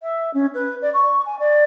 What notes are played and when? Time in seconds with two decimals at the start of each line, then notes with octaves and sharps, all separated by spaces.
0.01 E5
0.33 C#4
0.54 B4
0.81 D5
0.93 C#6
1.25 G#5
1.39 D5